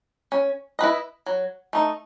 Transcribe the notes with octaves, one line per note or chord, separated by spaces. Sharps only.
C#4
E4 B4 D#5
F#3
A3 D#4